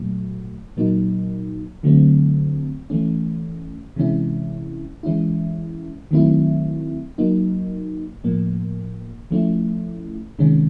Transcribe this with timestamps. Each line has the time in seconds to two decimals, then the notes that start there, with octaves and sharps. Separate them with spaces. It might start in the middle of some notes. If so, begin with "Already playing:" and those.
Already playing: A#2 F#3 A3
0.77 A#2 F#3 A#3 D#4
1.83 D3 F#3 A3 C4
2.90 E3 A3 C#4
3.96 C3 E3 G#3 C#4 E4
5.03 E3 G#3 C#4 E4
6.11 D#3 F#3 A3 C4 E4
7.18 F#3 A#3 D#4
8.24 A2 F3 A#3
9.31 F3 A3 C#4 E4
10.39 C3 D#3 G#3 C#4